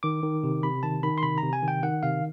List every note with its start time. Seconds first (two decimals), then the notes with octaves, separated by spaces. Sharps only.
0.03 D#3 D6
0.23 D#3
0.44 C3
0.63 C3 B5
0.83 D#3 A5
1.03 D#3 B5
1.18 C6
1.23 C3 B5
1.38 A#5
1.43 C3
1.53 G#5
1.63 D#3
1.68 G5
1.83 D#3 F#5
2.03 C3 F5